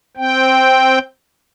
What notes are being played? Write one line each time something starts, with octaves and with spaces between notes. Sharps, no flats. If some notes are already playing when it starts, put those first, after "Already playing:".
C4 G5